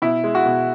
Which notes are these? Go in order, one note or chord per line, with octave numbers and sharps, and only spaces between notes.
B2 E4
G#3
F#4
B2